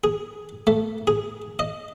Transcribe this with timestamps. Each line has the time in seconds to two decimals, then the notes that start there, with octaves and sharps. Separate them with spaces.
0.04 G#4
0.67 A3
1.07 G#4
1.59 D#5